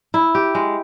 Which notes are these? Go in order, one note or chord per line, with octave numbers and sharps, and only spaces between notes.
E4
G4
G#3